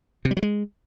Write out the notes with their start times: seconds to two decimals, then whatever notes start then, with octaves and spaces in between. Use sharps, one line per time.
0.25 C3
0.31 G3
0.37 F#3
0.43 G#3